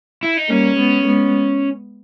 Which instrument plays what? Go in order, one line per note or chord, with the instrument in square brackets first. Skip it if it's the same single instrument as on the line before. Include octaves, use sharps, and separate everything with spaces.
[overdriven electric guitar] E4
D#4
[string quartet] G3 A#3 [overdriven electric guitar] C#4
[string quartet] G#3 B3
G#3 B3